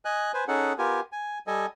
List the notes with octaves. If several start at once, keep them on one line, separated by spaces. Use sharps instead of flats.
D#5 G#5 F#6
B4 C5 G#5
C#4 D#4 G#4 A4 F#5
B3 F4 G4 A#4 G#5
G#5
G3 A4 D#5 G#5